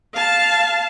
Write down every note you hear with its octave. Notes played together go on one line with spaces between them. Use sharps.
F5 A5